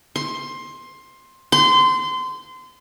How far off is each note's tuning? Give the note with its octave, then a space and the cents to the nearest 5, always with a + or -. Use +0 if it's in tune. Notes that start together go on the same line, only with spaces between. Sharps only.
C6 +15
C6 -25